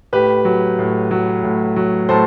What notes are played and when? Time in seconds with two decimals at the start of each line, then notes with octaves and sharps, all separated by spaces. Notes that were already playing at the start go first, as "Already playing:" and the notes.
0.13 A2 G4 B4
0.45 F#3
0.79 A2
1.11 F#3
1.44 A2
1.76 F#3
2.09 A2 A4 C5